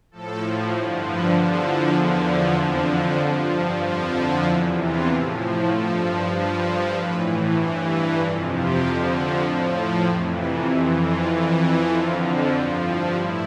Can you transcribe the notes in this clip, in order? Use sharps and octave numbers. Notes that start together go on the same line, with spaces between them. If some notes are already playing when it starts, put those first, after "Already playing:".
A2 F3 A4
G2 D3 F3
B4
E2 D3 F3
A4
E2 D3 F3 E4
F2 D3 F3 C4
G2 F3 D4
C4
F2 D3 F3
E4
E2 C3 E3 E4
F4
A2 F3
G2 F3 A4
G2 F3 B4
A4
A2 E3 B4
G2 E3 C5
B4
F2 C3 F3 A4
G4
F2 D3 F3
A2 F3
A4
F2 C3 E3
B4
F2 E3 G4
F4
F2 E3
F2 D3 F3 F4
G2 F3 F4
E4
A2 E4